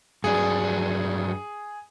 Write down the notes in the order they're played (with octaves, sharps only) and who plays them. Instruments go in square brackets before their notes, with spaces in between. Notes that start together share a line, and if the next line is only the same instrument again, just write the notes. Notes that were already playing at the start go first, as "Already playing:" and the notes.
[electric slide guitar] G2 F#3 D4 [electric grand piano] G#4